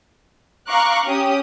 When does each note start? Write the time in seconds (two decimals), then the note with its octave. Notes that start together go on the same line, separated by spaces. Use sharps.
0.68 F5 A#5 C#6 D6 F#6
1.05 C#4 G4 D#6